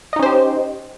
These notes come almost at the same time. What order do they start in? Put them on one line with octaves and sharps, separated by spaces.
D#5 D#4 C#4 C5 G4